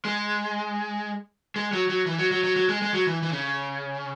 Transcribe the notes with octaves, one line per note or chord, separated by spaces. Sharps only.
G#3
G#3
F#3
F#3
E3
F#3
F#3
F#3
F#3
G#3
G#3
F#3
E3
E3
C#3